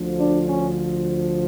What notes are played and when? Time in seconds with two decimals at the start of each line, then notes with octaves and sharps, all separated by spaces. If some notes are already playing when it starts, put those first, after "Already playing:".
Already playing: D2 D3 F3
0.19 D4
0.48 C#4